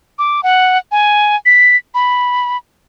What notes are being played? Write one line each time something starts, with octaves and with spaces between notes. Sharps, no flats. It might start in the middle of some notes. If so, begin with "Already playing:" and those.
D6
F#5
G#5
B6
B5